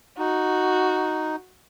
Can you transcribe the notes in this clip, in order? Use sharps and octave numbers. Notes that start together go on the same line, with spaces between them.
D#4 F#4